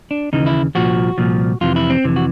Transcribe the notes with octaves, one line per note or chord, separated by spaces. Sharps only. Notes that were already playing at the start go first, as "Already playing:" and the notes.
D4
D#2 C#3 E3 D#4
E4
C2 A#2 F3 F#4
C2 A#2 F3
F2 C3 E3 F4
E4
C4
F2 C3 E3
F#4